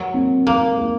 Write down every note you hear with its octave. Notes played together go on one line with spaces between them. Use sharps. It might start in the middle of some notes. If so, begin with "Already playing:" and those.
Already playing: F#3 A#4
C4
A#3 A#4
A#4